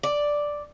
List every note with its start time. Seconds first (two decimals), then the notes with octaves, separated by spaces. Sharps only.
0.03 D5